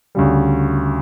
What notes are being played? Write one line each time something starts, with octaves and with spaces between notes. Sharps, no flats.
D2 C#3 G3